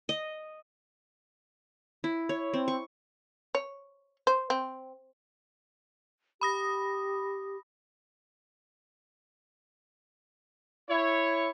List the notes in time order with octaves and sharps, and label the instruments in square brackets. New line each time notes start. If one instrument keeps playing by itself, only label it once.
[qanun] D#5
E4
C#5
C4
C#6
[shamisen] C#5
C5
C4
[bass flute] G4 [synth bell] B5 D#6 A#6
[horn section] E4 C#5